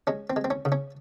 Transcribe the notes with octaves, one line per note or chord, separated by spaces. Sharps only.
G#3 C#4
C4
G#3
C4
C#4
C#3
C#4